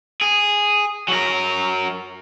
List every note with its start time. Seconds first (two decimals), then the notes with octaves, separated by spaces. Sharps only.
0.21 G#4
1.08 F#3 A#4